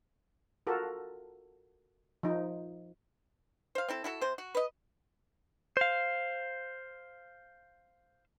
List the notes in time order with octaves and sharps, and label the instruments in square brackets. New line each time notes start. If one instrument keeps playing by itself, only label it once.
[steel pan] F4 F#4 A4 A#4
F3 D#4
[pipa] C5 F5
C4 E4 A4
E4 F#4 A4
C3 C5
F#4
B4 D#5
[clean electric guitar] C5 F5